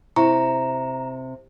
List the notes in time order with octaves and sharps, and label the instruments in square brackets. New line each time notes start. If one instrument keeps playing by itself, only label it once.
[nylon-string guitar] C3 [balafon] E4 [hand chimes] A#5